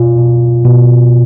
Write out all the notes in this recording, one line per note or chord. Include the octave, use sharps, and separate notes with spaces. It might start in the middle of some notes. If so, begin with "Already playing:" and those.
Already playing: B2 F4
B2
B2